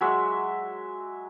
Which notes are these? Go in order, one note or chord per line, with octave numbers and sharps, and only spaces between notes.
F#3 G#3 E5